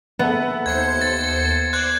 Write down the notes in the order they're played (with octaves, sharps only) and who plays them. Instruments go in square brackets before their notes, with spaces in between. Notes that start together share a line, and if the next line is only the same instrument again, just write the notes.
[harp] B3 [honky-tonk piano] A4 E5 F#5
[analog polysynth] D#2 C5 C#7 [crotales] G#6
[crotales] A6
[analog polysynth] C5 D5 [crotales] F#6 G#6